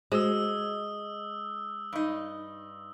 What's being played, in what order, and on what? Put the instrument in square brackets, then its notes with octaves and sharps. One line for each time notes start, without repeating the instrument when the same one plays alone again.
[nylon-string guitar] G#3 [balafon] F#4 C5 [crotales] D#6 E6
[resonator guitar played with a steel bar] G2 D#4